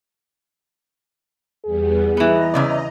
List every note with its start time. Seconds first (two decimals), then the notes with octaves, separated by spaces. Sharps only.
1.65 E2 G3 B3 G#4
2.17 E3 B3 D#5 A#5
2.54 E2 C#3 D5